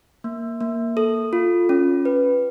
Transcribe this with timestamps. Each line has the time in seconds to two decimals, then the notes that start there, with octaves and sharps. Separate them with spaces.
0.24 A#3
0.61 A#3
0.97 A4
1.33 F4
1.69 C#4
2.05 B4